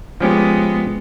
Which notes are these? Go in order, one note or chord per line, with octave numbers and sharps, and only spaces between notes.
F3 G#3 B3 C#4 G4